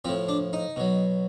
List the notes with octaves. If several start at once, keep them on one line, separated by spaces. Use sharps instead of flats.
A2 F3 C4
D4
D#4
B2 F#3